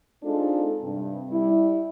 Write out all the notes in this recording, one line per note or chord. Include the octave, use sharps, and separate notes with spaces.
G#3 C4 D4 D#4 F4 A4
G2 C3
G3 E4